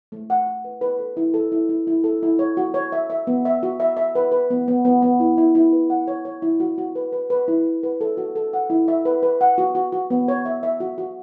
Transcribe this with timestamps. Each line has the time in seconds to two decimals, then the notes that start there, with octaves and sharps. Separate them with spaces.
0.12 A3
0.30 F#5
0.46 F#5
0.64 B4
0.81 B4
0.99 A4
1.17 E4
1.34 A4
1.52 E4
1.69 E4
1.87 E4
2.04 A4
2.23 E4
2.39 C#5
2.57 F#4
2.74 C#5
2.92 E5
3.10 E5
3.27 B3
3.45 E5
3.63 F#4
3.80 E5
3.97 E5
4.15 B4
4.32 B4
4.50 B3
4.68 B3
4.85 B3
5.02 B3
5.20 E4
5.38 E4
5.55 E4
5.73 B4
5.90 F#5
6.08 C#5
6.25 C#5
6.42 E4
6.60 F#4
6.78 F#4
6.95 B4
7.13 B4
7.30 B4
7.48 E4
7.65 E4
7.83 B4
8.01 A4
8.17 F#4
8.36 A4
8.53 F#5
8.70 E4
8.88 E5
9.05 B4
9.23 B4
9.41 F#5
9.58 F#4
9.75 F#4
9.92 F#4
10.10 B3
10.28 C#5
10.45 E5
10.63 E5
10.80 F#4
10.98 F#4